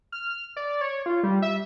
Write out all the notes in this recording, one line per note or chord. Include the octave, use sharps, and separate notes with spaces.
F6
D5
C#5
F4
G3
E5